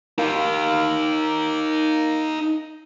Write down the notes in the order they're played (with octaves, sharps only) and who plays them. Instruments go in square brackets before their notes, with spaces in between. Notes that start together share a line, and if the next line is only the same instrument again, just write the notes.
[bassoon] A#3 [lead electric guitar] D#4 F5